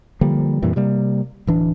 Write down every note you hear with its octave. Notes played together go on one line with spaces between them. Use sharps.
D3 F3 G3 A#3
F2 A#2 E3 G3
C3 G3 A#3
D1 E3 D4